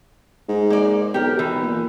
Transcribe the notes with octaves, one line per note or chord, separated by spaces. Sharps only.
G#2
A#3 D5
B1 G4 A#4
E3
A#2